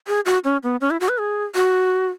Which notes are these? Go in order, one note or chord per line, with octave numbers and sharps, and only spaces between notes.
G#4
F#4
C#4
B3
C#4
E4
F#4
B4
G#4
F#4